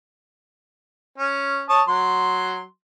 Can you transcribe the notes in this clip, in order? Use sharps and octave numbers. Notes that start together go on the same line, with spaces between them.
C#4
C#5 A5 D#6
F#3 C6